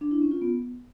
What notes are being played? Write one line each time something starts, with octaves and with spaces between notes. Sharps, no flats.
D4
E4
C#4
F4
B3